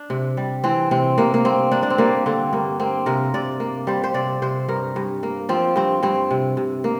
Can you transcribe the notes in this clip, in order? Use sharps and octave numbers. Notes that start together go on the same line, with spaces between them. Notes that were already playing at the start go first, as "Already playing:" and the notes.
Already playing: D4
C3
G3
E3 C4
C3 C4
C3 A#3
A#3
G2 C4
A#3 D4
D4
C4
G3 A#3
D3 C4
G2 A#3
A#3 C4
C3 A#4
C3 D5
A#3
G3 C5
C5
C3 D5
C3 C5
G2 A#4
G2
A#3
F3 C4
G2 C4
G2 C4
C3
C3
A#3